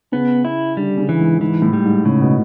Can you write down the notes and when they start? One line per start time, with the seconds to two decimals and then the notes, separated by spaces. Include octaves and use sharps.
0.12 C#3 B3
0.45 E4
0.77 D3 G3
0.98 C#3
1.09 E3
1.19 G#2
1.41 G#2 E3
1.62 A2
1.73 G3
1.84 G#2
2.05 A2 C#3
2.21 B2